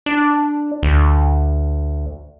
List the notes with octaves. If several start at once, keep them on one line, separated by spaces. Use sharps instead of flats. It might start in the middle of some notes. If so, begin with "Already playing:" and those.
D4
D2